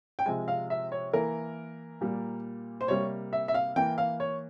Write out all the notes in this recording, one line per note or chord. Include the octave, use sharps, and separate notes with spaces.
G5
C3 F3 G#3 G#5
F5
E5
C#5
E3 A#3 A#4
A#2 G3 A#3
C5
C3 G3 A#3 C#5
E5
E5
F5
E3 A#3 G5
F5
C#5